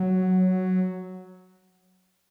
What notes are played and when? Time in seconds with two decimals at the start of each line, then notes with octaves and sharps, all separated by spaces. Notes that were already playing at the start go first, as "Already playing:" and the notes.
Already playing: F#3